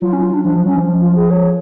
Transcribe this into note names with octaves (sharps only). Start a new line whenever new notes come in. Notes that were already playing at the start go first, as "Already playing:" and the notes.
F#3 F4
C#4
F4
D4
F3 D4
F3
F#3 C#4
F3
F4
G#4
C#5